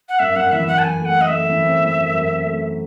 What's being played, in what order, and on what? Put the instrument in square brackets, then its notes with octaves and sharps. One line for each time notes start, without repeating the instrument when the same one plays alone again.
[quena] F#5
[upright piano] F#2 [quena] E5
[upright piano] F#2 [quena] F#5
[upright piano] E3 [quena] E5
[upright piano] F#2 [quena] F#5
[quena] A5
[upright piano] F#2 [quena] G#5
[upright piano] A3 [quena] F#5
[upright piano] A3 [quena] D#5
[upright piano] A3 [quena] E5
[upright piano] E3
C4
E3
F#2
F#2
C4
A3